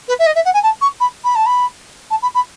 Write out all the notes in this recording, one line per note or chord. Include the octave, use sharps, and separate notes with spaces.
B4
E5
D#5
E5
F#5
G#5
A5
C#6
B5
B5
A5
B5
A5
B5
B5